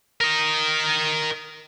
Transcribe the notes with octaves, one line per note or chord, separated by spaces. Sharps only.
A#4 D#5